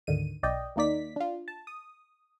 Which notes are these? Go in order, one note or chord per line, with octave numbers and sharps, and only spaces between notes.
D2 G#2 D3 D#3 D#7
B1 D5 D#5 G5
D#2 A#3 D#4 D5 B6
D4 F4
A5
D#6